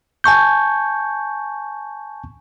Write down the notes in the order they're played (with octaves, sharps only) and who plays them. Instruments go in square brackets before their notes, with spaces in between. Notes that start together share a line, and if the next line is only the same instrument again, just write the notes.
[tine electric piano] G#5 A5 C#6 G6